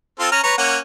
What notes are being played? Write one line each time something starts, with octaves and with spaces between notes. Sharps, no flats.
C4 F4 A4
C#4 A#5 F6
B4 C#5 A#5
A#3 C#4 F#5